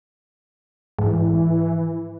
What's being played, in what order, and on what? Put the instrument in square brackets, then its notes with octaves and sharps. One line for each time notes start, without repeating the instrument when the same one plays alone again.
[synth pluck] G#2 [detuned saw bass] E3